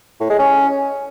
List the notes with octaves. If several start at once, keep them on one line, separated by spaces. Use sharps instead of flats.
A2
G#3
C#4